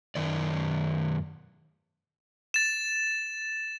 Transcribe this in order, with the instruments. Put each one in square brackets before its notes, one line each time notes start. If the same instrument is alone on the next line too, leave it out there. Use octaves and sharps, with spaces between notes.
[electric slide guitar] F#2 D#3 D5
[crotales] A6 E7